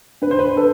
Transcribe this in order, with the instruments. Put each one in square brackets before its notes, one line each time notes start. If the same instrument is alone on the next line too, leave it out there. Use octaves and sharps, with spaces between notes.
[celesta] D4 [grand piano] B4
[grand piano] C5
B4
[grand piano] A4 [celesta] B4